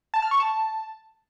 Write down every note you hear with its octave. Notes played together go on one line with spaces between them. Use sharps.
A5
F6
C#6
A5